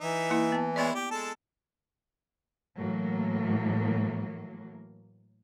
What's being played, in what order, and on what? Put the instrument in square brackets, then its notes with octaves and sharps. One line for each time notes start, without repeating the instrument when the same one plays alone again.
[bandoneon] E3 [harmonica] D#4 E5
[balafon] A#3 E4
B3 A5
[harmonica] G#3 E4 C#5 [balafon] B3 D5
[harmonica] G4
G#3 A4 A5
[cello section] A2 E3 F#3 A#3